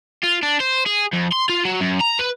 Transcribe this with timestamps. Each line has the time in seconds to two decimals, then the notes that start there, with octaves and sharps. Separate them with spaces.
0.24 F4
0.43 D4
0.60 C5
0.86 G#4
1.13 F2
1.32 C6
1.49 F4
1.65 F#3
1.81 F#2
2.01 A#5
2.19 B4